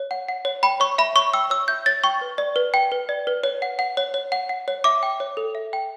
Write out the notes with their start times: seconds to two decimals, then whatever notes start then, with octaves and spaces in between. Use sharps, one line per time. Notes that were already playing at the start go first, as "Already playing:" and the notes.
Already playing: C#5
0.11 F#5
0.29 F#5
0.45 C#5
0.63 G5 B5
0.80 C#5 C#6
0.98 E5 B5
1.16 C#5 C#6
1.34 G5 E6
1.50 C#5 E6
1.68 E5 G6
1.86 C#5 A6
2.04 G5 C#6
2.21 B4
2.38 D5
2.56 B4
2.74 G5
2.92 B4
3.09 D5
3.27 B4
3.44 C#5
3.62 F#5
3.79 F#5
3.97 C#5
4.14 C#5
4.32 F#5
4.49 F#5
4.68 C#5
4.84 E5 D6
5.03 G5
5.20 C#5
5.37 A4
5.55 E5
5.73 G5